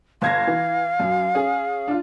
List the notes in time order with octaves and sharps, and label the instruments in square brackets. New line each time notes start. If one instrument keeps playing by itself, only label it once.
[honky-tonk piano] G1 G#6 A#6 [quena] F5
[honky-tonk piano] E3
F#2 F#3
C#4 G#4
D4 F4